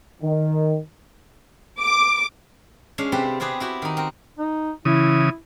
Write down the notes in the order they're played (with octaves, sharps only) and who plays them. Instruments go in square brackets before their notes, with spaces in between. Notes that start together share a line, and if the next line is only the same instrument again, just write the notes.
[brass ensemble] D#3
[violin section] D6
[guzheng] G#3 C#4 D4 F5
C3 C4 G4 A4 B4
B3 C4 G4 G#4 B4
E4 F#4 G4
D#3 D#4
C4 A#4
[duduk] D#4
[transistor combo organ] C#3 E3 D#6 [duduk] E4